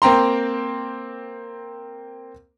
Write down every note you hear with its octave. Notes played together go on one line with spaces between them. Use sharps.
A#3 C4 G5 A#5 C6